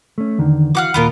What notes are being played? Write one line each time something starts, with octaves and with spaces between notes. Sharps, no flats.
A3 C#4
E2 D3 D#3
E3 F#4 F5 F#5 D6
D#2 A#2 B3 F4 A#4